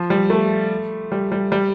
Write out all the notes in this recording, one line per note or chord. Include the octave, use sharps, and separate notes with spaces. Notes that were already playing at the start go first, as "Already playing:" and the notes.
Already playing: F3
G3
A3
G3
G3
G3